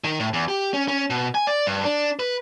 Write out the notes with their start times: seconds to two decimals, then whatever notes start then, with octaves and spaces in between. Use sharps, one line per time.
0.04 D#3
0.20 A2
0.33 E2
0.48 G4
0.74 C#4
0.88 C#4
1.10 B2
1.35 G#5
1.47 D5
1.66 G2
1.85 D4
2.19 B4